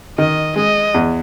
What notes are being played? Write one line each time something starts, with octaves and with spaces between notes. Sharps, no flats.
D#3 D#5
G#3 D#5
E2